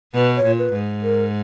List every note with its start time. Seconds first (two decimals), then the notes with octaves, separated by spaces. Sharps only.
0.14 B2 B4
0.36 C#5
0.44 A#2
0.59 B4
0.73 G#2
1.03 A#4